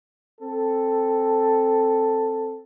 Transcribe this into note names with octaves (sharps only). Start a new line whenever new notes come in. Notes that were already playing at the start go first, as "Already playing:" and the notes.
C4 A4